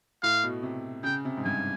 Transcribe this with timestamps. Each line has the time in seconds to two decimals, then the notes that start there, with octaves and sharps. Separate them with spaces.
0.23 A2 F5
0.44 B2
0.63 C3
1.04 C#3 G5
1.25 C3
1.37 G#2
1.45 G2 G#5